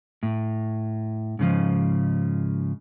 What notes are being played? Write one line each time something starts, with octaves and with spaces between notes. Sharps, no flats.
A2
G#2 C#3 F3